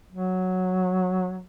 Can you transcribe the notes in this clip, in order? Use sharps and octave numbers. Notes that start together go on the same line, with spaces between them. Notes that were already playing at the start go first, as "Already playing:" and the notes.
F#3